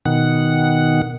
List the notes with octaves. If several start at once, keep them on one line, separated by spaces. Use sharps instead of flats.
B2 D#3 F#5